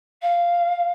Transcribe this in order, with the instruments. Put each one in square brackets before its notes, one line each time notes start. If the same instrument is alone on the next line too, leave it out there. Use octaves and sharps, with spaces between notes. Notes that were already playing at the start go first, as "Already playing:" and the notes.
[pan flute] F5